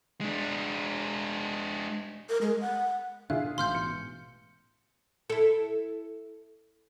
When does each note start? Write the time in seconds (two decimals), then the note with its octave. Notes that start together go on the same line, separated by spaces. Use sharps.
0.21 G#3 D4
2.29 A#4
2.42 G#3
2.61 F#5
3.30 B2 D3 D4 E4 F4 G#4 F#6
3.58 A1 G#2 B2 C6 F6 G6
3.75 C#7
5.30 E4 A4